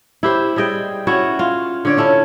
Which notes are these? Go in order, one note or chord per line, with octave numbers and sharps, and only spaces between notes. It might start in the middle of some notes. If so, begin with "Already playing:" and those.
E4 G4 C5
G3 G#4 D#5 G5
C#4 E4 F#4 C#5
F4
D3 C#5 D5
C#4 E4 A4 C#5